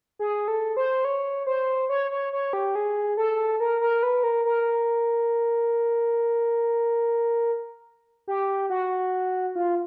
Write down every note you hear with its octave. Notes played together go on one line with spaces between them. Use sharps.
G#4
A4
C5
C#5
C5
C#5
C#5
C#5
G4
G#4
A4
A#4
A#4
B4
A#4
A#4
G4
F#4
F4